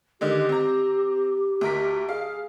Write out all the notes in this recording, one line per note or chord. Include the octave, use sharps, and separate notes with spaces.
D3 D#3 G#3 G4
C4 A#5
D2 A#4 B6
G#4 F5